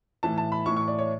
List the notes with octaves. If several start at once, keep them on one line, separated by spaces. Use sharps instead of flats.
A2 E3 A5
A5
B5
A2 E3 C#6
C#6
D5
C#5